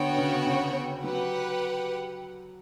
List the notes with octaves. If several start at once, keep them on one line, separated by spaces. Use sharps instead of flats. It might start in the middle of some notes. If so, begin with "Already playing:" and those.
Already playing: D3 B3 F#4 C#5 G5
C#3
C#3
F#3 G4 B4 F#5